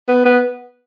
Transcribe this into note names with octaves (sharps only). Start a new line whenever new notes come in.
B3
B3